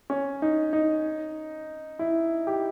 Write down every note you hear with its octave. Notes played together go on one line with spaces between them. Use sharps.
C#4
D#4
D#4
E4
G4